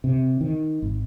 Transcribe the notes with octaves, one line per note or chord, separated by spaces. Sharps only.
C3
D#3
G#1